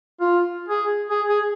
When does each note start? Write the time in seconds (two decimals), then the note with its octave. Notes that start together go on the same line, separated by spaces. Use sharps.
0.21 F4
0.68 G#4
1.10 G#4
1.28 G#4